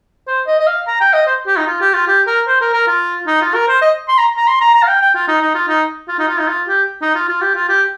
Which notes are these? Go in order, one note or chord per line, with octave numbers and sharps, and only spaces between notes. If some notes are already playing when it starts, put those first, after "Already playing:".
C5
D#5
D#5
F5
A#5
G5
D#5
C5
G4
D#4
F4
G4
F4
G4
A#4
C5
A#4
A#4
F4
D#4
F4
A#4
C5
D#5
C6
A#5
A#5
C6
A#5
A#5
F5
G5
G5
F4
D#4
D#4
F4
D#4
F4
D#4
F4
D#4
F4
G4
D#4
F4
F4
G4
F4
G4